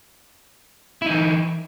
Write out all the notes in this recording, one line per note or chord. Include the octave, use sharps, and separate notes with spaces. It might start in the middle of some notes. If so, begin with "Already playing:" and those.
E3 D#4 E4